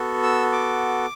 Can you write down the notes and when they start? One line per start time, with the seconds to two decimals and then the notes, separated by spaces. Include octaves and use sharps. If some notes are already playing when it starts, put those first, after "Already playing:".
Already playing: B3 F#4 A4
0.23 E6
0.52 D6